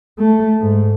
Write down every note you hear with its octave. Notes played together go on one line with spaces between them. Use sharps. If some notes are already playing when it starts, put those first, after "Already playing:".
A3
G#2